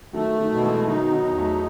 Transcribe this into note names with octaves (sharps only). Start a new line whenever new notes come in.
D#3 F#3 A3
D#3 F#3
B2
E3 G#3
D#3 F#3 D#4
D#3 F#3
E2
F#3 A3